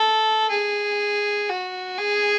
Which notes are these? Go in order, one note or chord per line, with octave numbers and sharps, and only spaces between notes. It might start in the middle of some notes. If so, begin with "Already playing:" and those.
Already playing: A4
G#4
F#4
G#4